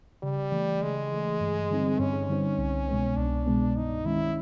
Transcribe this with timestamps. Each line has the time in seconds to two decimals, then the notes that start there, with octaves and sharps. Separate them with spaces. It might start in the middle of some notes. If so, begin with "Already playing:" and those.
0.23 C#3 G3
0.52 E3 A3
0.82 C#3 G#3
1.11 E3 A3
1.41 G2
1.70 D3 G3 C4 D#4
1.99 G2 C#4
2.29 D3 G3 C4 D#4
2.58 C2
2.88 B2 G#3 B3
3.17 C2 D4
3.47 B2 G#3 B3
3.76 G2 D#4
4.05 D#3 G#3 C#4 E4